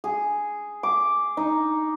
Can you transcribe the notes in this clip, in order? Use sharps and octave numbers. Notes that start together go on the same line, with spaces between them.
G#4
D6
D#4